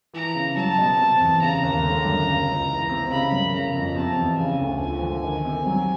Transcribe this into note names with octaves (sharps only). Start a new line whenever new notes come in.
E3 A#5
C#3
F#3 A5
B2
C3
E2
C#3 A#5
D#2
D3
F#2
C#3
C#2
E3
C3
C#3 B5
F#2
C#3 A#5
F2
C3 A5
E2
C#3 G#5
D2
F3 G#5
D3
D#3
C3
F#3